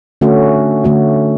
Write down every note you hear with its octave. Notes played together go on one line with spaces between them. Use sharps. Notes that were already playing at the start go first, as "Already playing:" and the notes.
D3 A3 C#4 F#4
D3 A3 C#4 F#4